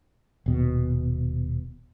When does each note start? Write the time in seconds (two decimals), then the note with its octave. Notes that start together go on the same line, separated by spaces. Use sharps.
0.46 D#1 B2